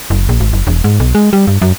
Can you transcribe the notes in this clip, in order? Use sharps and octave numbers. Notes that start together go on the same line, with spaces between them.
F#1
A#1
G#1
F#1
E1
G#2
B1
G#3
G3
G2
F#2